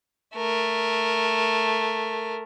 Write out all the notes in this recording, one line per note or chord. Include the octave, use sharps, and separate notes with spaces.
A3 A#4